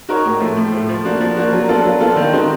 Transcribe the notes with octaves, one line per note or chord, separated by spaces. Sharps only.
D#4 F#4 A#4 C#5
A2
F3 A3
A2
F3 A3
F3
A#3 D4 F#4
F3
A#3 D4 F#4
F#3
B3 D4 F4 A4
F#3
B3 D4 F4 A4
D#3
G#3 C4 D#4 F#4